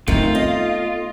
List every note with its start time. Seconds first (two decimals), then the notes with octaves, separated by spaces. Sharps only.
0.08 D#3 A3 B3 C4 D#4 F4
0.35 D#5